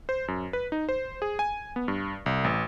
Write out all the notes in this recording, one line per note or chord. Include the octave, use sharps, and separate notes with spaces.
C5
F#2
B4
D#4
C5
G#4
G#5
B3
G2
C2
A1